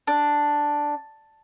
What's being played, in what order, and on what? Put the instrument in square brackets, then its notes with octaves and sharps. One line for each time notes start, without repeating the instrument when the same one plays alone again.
[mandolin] D4